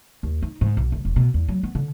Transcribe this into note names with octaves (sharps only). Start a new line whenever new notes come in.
D#2
D#4
G#2
B1
F#1
E1
B2
E2
F#3
B3
D3